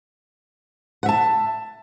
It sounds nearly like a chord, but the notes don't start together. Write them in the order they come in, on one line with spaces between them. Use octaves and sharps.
F#5 E5 A5